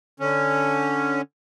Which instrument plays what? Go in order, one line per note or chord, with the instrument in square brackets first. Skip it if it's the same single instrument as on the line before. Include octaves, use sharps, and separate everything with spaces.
[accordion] D3 C#4